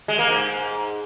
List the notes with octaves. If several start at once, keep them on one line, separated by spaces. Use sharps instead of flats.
G#3
A#3
G#2